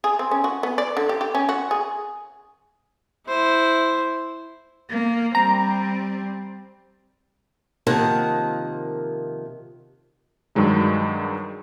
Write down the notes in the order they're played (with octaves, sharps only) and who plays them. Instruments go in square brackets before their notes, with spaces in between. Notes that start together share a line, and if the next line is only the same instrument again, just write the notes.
[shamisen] G#4
C4
C#4
F#4
B3
D5
D3
G4
G4
C#4
F#4
G#4
[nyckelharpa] E4 C5
[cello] A#3
[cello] G3 C4 [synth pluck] A#5
[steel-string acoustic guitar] C3 D#3 F3 A#3 F#5 A5
[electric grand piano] G2 D#3 F#3 G#3 D#4